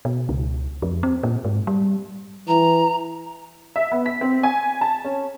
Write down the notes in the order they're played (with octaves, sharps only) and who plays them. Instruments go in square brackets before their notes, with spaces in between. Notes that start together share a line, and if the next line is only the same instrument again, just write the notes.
[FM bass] B2
C#2
F2
C4
A#2
G#2
G3
[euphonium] E3 [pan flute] A#5
[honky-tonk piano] E5
B3
B6
C4
G#5
A5
C#4